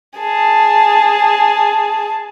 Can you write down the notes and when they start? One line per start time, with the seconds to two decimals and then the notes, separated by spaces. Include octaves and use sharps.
0.19 G#4 A5